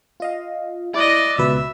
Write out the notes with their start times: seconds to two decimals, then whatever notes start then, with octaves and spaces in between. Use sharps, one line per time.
0.20 F4 D#5 F5
0.94 E4 D5 D#5 D6 F#6
1.39 C#2 B2 B4 E5